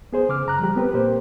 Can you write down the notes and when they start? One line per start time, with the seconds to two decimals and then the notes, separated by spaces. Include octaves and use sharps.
0.13 B3 G#4 C5
0.29 C#3 D6 F6
0.46 F#2 A#5 F#6
0.59 F3 G3 G4
0.76 B3 C4 G4 A#4 B4
0.94 A#2 A#3 G4 A#4 C5